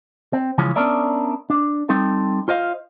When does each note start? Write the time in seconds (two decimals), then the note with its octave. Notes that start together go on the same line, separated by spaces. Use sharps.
0.33 C4
0.58 C#3 E3 F3 G#3 C#4
0.76 B3 C#4 D4 A#4 D5 E5
1.50 D4
1.89 G3 C4 D#4 A4
2.48 F4 C5 D#5 F5